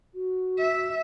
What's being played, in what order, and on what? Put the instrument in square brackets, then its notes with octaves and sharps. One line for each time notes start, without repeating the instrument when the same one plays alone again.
[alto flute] F#4
[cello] E5